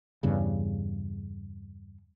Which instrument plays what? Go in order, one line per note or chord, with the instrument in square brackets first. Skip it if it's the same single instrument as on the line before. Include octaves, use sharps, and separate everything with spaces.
[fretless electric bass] E2 G2 C#3